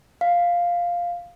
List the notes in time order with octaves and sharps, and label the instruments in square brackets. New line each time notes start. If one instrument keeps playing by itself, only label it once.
[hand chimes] F5